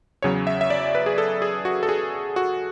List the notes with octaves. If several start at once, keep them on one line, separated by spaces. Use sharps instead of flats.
E2 C#3 F#3 C#5
E5
E5
D5
B4
G#4
A4
G#4
F#4
A4
G#4
F#4